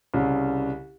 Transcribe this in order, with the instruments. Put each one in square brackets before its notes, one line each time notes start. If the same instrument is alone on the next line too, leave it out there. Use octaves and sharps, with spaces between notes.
[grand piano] C2 C#3